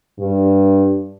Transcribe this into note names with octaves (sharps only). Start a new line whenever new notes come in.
G2